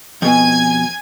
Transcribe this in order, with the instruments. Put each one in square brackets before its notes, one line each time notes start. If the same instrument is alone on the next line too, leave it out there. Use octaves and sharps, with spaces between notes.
[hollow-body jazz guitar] F2 B2 [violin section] G#5 G#6